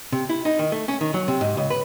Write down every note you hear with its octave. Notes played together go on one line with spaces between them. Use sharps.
C3
E4
D#4
D#3
A3
C#4
D#3
F#3
C3
G#2
C#2
B4